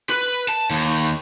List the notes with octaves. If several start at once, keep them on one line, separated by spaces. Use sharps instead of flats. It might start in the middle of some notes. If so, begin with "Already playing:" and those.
B4
A5
D#2